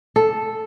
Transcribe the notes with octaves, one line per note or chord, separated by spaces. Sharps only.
A4